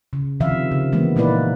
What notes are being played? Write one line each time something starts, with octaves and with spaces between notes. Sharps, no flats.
C#3
C3 D#3 F3 E5 F5
C#3
E3 G#3 A#3 B3
A#2 A#3 D#4 E4 B4 D5